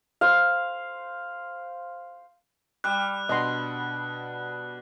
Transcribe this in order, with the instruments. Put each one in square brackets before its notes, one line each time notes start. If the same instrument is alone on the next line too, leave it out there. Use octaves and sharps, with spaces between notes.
[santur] C5 F5
[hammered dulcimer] G3 D6 [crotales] F#6
[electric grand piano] B2 D4 F#5 [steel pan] D#5 C6